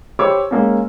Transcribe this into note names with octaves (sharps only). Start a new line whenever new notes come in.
G4 C5 C#5 B5 D6 E6
G#3 A#3 C#4